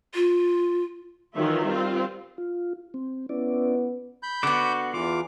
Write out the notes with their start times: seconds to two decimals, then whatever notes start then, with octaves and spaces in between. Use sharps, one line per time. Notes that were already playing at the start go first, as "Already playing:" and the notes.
0.15 F4
1.35 D#3 E3 F#3 F4 E5
1.64 G3 C4 F4
2.38 F4
2.94 C4
3.29 B3 C#4 E4 D5
4.23 B5 G6
4.43 D3 B3 F#4 D6
4.94 E2 E3 F4 D6